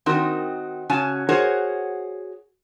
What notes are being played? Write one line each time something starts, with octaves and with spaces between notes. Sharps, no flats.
D#3 C4 D#4 F#4 A#4
C#3 C#4 F#4 G#5 A5
F#4 G#4 A#4 C5 C#5 F#5